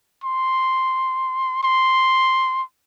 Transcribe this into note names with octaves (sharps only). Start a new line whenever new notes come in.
C6
C6